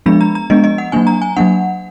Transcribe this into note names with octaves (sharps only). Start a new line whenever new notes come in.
F3 G#3 B3 D4 B5
A#5
A#5
F3 G#3 B3 D4 D#5
D#5
F#5
F#3 A#3 D4 G#5
A#5
G#5
F#3 A#3 D4 F#5